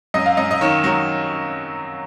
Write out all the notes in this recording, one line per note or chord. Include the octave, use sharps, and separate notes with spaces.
F#2 D#5
F5
F#2 D#5
D#5
D#3 C#5
F#3